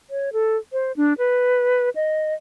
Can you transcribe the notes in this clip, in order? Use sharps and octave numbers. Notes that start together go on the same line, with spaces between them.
C#5
A4
C5
D4
B4
D#5